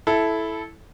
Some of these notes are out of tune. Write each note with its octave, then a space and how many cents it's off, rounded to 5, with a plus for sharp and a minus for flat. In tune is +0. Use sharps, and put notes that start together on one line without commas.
E4 +0 A4 -15